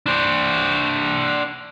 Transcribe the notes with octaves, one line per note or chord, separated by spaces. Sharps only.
D4 C5